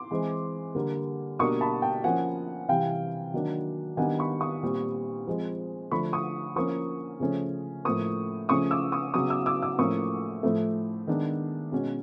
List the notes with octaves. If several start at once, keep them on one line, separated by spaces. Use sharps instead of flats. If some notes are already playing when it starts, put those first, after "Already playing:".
Already playing: C6 D6
E3 G#3 C4
D3 G3 A#3
B2 G3 A#3 D4 C#6 D#6
A5 B5
G5 A5
F3 A#3 C#4 F#5 G#5
C3 E3 G3 F5 G5
D#3 F#3 A#3 D4
D#3 G3 B3 D4 F#5 G#5
B5 C#6
C#6 D#6
A#2 G3 C4
F3 G#3 C4
D3 F3 A3 D4 B5 C#6
C#6 D#6
F3 A#3 C#4 C#6 D#6
C#3 F3 A3 C#4
A2 F3 A#3 C#6 D#6
C#3 F3 A3 C#4 C#6 D#6
D6 E6
C#6 D#6
C#3 F#3 B3 C#6 D#6
D6 E6
D6 E6
D6 E6
A2 F3 A#3 C#4 C#6 D#6
A2 F3 A3
D#3 G#3 B3 D4
B2 G#3 C#4